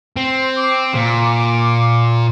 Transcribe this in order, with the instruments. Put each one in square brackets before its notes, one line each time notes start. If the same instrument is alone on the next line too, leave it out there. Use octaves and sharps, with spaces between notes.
[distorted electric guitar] C4
[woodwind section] D6
[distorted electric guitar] A#2